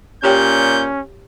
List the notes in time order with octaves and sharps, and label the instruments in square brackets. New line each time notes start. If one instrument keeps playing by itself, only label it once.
[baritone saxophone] A#2 [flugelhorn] C#4 [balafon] G4 C#5 G5 [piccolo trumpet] G6